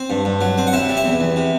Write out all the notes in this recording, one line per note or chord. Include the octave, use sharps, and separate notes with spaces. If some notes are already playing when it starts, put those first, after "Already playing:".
Already playing: C4 C5
G2
G2
F#3
C4
F#5
C3 E4 E5
G3
E4 E5
E2
E2
C3